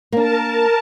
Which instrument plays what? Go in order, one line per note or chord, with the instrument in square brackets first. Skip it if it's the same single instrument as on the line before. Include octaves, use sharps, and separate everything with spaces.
[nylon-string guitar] A#3 D4 [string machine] A#4 A5